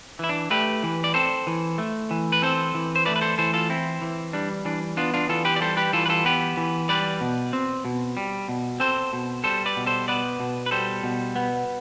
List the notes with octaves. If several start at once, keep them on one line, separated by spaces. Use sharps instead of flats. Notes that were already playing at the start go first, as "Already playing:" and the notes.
E3 E4
D4
A3 G4 B4
E3
D5
C4 A4 C5
E3
A3
E3
B4
C4 A4 C5
E3
C5
A3 B4 D5
B4
A4 C5
E3 A4 C5
F4 A4
C4 E4
E3
G3 D4
E3 D4
B3 D4 F4
D4 F4
E3 F4 A4
G4 B4
D5
G3 A4 C5
G4 B4
E3 F4 A4
B4
F4 A4
B3 G4 B4
E3
G3 B4 D5
B2
C4
B2
G3
B2
C4 A4 C5
B2
G3 A4 C5
B4 D5
B2
A4 C5
B3 B4 D5
B2
B4
G3 A4 C5
B2
B3